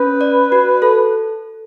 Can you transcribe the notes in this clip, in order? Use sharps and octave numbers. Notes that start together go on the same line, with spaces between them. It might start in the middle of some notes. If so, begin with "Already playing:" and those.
Already playing: C#4 B4
D5
F#4
A4